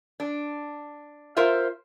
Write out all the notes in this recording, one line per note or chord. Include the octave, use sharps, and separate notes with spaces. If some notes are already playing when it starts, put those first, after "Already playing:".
D4
F4 A#4 C5 E5